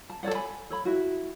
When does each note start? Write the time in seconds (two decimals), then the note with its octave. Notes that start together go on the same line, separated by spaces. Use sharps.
0.09 A5
0.23 A4 C#5 D5 F#5
0.35 G#5 B5
0.70 A4 C#5 B5
0.85 E4 F#4